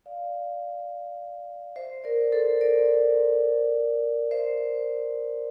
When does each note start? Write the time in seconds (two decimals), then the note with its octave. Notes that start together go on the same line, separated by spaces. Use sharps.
0.06 D5 F5
1.76 C5 E5
2.04 A#4 D5
2.32 A4 C5
2.61 A#4 D5
4.31 C5 E5